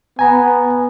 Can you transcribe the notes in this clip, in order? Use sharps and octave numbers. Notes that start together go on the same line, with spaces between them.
B3 G#5 A#5